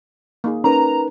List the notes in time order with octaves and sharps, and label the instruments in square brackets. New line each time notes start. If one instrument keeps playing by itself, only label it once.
[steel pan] A#3 D#4 G#4
[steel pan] C#4 [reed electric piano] D#4 A#4 B4 [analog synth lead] A#5